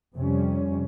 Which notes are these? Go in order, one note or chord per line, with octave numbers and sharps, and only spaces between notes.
F2 C3 G3 C#4